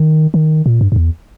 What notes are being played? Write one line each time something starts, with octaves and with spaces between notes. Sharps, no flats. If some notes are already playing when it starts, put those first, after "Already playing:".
Already playing: D#3
D#3
A#2
G2
G2
E2